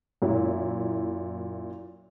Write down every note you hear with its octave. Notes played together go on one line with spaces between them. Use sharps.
F#2 A#2 E4